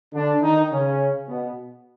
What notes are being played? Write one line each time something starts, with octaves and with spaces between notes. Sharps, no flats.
D3 D4
D#3 D#4
C#3 C#4
B2 B3